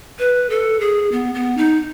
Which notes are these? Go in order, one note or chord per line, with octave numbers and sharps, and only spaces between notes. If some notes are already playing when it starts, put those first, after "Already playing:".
B4
A4
G#4
B3
B3
D#4